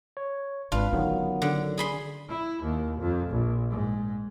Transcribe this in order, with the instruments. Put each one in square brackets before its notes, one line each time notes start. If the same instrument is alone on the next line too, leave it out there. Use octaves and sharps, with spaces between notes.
[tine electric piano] C#5
[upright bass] G#1 [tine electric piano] D4 [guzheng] F4 [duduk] B4
[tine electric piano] G1 D#3 F#3 [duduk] B3 [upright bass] C#4
[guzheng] D3
G#4 B5 C6
[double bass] E4
D#2
F2
A#1
G#2